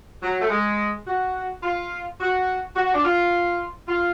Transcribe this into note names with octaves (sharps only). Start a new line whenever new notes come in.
F#3
A3
G#3
F#4
F4
F#4
F#4
D4
F4
F4